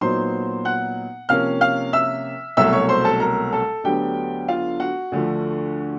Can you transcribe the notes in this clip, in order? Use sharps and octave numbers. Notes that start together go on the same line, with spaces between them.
A#2 F#3 B3 D#4 C5 C6
F#5 F#6
C3 F3 A#3 C#4 F5 F6
F5 F6
E5 E6
C2 B2 F#3 A3 E5 E6
C#5 C#6
C5 C6
A4 A5
A#4 A#5
A4 A5
D2 D3 F#3 B3 G4 G5
F4 F5
F#4 F#5
D2 D3 F3 A3